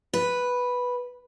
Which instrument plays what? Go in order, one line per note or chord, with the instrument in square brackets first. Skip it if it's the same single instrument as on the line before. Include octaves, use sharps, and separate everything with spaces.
[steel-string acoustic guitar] B4